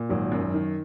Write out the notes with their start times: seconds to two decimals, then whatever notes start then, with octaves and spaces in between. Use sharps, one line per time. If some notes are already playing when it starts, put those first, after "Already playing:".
Already playing: A#2
0.09 G#1 F#3
0.32 F#2
0.54 D#3